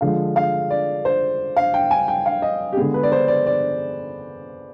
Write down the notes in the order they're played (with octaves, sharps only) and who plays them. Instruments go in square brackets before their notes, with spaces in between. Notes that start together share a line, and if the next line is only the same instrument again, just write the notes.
[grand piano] D3 F3 G#3 F5
F5
D5
C5
F5
G5
G#5
G5
F5
D#5
G4
D3 G#3 B3 G#4
B4
D5
C5
D5
D5